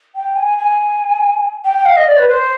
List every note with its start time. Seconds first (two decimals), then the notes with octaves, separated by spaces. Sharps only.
0.15 G5
0.35 G#5
0.58 G#5
1.64 G5
1.85 F5
1.96 D#5
2.07 D5
2.17 B4
2.28 C5